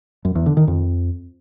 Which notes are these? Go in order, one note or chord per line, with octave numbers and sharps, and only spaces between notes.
F#2
E2
D3
D#3
F2